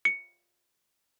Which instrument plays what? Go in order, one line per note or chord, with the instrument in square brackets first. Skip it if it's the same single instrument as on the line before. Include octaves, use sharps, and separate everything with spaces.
[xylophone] C#7